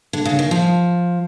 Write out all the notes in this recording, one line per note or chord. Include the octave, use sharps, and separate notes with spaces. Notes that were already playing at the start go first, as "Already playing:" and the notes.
D3
C#3
D#3
F3